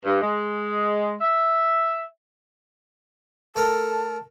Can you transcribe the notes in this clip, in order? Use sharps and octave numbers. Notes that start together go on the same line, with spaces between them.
G2
G#3
E5
A3 A4 A#4 A5